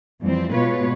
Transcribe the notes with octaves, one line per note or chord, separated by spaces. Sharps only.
F2 E3 F3 G3 C4
B2 G#3 B3 F4 B4 C#5